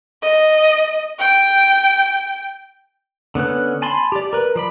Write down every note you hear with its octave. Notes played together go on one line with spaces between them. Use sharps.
D#5
G5
D3 B3 C#4 F#6
G#5 A5 B5 C6
G4 D5
A#4 B4
F3 D5 B5